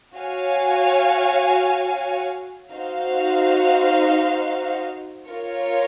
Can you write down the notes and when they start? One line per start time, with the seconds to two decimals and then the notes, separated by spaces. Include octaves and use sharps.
0.14 F#4 C#5 F5 G#5
2.71 D#4 F#4 C5 F5
5.29 F4 A#4 C#5